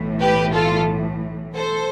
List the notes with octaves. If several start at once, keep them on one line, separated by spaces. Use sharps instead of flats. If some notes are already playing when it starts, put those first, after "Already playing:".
Already playing: B1 A2 E3
G4 B4
F4 A4
A4 C5